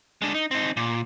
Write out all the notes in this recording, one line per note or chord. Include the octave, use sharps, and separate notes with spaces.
G#3 D4
D#4
C4 D#4
A#2